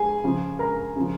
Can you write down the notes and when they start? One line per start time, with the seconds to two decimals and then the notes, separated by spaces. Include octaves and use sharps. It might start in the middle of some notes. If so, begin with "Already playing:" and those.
Already playing: G#4 G#5
0.24 C#3 F3
0.59 A#4 A#5
0.96 C#3 F3